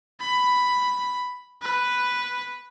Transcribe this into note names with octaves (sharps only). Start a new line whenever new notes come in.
B5
B4